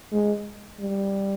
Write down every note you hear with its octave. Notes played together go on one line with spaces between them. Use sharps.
G#3
G3